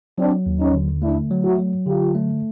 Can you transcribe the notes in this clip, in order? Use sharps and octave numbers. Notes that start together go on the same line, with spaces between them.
F#3 C4 D4
D#2
C#4 D#4
D3
A3 D4 E4
F#3
E4 F#4
F#3
D3 F4 G4
A3